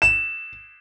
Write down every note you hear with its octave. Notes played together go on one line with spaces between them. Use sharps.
E7